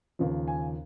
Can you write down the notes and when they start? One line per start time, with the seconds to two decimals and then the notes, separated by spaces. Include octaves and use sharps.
0.19 D#2 C#3 F3
0.48 G#5